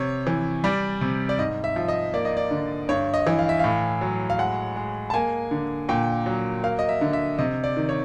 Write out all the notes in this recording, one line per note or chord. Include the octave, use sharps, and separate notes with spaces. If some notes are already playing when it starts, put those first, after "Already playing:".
Already playing: C3 C#5
E3
G3 D5
C3
D5
G#2 D#5
E5
F3
D#5
A#3 D5
D#5
D5
D3
G2 C#5
D#5
E3
F5
E5
A2 F5
F#3
F5
G#3 F#5
G#3
A5
A#3 G#5
D3
A#2 G5
F#3
A#3 F5
D#5
E5
D3
E5
C3 D#5
D5
D#3
C#5